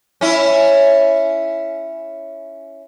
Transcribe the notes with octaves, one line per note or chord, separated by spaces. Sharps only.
C#4 E4